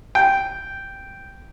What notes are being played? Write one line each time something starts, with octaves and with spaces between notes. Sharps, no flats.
G5